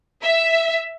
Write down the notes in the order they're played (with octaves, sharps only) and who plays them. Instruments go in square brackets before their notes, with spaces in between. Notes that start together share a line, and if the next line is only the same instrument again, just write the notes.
[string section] E5